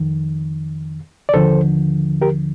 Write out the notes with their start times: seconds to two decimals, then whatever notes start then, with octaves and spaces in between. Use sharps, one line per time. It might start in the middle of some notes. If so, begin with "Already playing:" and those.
Already playing: F2 D#3
1.29 D5
1.34 D#2 D3 F3 A4 C5
2.22 G4 A#4